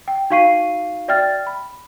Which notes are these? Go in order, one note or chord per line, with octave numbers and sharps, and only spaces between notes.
G5
D#4 F#4 F5 C#6 C7 D#7
F#4 D5 E5 G5 F6 A6
B5